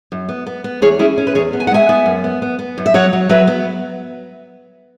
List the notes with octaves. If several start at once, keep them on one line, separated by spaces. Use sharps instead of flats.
F#2
B3
B3
B3
E2 G#4 C#5
C#4 E4 G#4
C#4
B4
E2 G#4 C#5
B3
G#5
F#5
G#3 E5 G#5
B3
F#2
B3
B3
B3
F#2
E5
F#3 C#5 F#5
F#3
F#3 B4 E5
B3